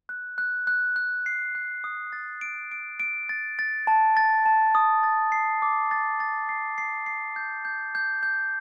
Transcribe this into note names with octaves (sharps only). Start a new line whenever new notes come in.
F#6
F#6
F#6
F#6
C7
F#6
D#6
A6
D7
D7
D7
A6
A6
A5
A6
A5
D#6
A6
C7
D6
A6
A6
C7
C7
C7
G6
G6
G6
G6